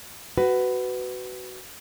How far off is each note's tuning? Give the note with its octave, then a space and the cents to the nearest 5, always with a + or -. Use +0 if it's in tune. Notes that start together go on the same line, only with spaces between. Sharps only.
F#4 +15 B4 +15